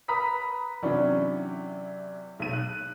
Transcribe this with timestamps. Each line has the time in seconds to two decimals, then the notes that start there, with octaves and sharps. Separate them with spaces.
0.08 B4 A#5 B5 D#6 B6
0.82 C3 E3 F#3 C#4 D4
2.40 B1 D#7
2.53 F#6